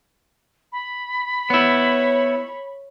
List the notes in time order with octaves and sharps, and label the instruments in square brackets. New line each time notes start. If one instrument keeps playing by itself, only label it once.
[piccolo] B5
[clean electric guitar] B3 E4 [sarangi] C#5